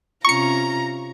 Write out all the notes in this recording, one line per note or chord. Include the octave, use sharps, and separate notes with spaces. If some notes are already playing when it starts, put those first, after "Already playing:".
C3 C#4 F4 A#5 C#6 C#7